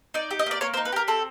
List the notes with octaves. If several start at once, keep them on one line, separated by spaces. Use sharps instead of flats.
D#4 D5
G4
D#5
A#3 D5
A#3 C#5
C5
D#4
B4
G4 A#4
C4 A4